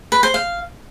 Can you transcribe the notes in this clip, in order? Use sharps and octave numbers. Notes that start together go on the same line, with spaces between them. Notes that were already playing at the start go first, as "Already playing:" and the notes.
B4
C5
F5